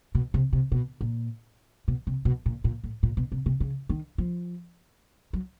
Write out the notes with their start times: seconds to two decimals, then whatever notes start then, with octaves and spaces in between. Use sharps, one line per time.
0.15 B2
0.34 C3
0.53 C3
0.72 B2
1.01 A#2
1.88 B2
2.07 C3
2.25 B2
2.46 A#2
2.64 A#2
2.84 A2
3.03 A#2
3.17 B2
3.32 C3
3.46 C3
3.60 C#3
3.90 D#3
4.18 F3
5.33 F#3